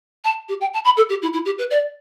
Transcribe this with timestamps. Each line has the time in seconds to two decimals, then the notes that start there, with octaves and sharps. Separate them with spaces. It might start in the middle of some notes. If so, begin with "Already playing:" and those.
0.24 A5
0.48 G4
0.61 G5
0.73 A5
0.85 B5
0.97 A4
1.09 G4
1.22 E4
1.33 E4
1.45 G4
1.58 B4
1.70 D5